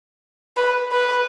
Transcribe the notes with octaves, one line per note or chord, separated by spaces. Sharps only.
B4
B4